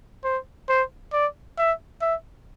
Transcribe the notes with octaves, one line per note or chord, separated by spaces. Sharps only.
C5
C5
D5
E5
E5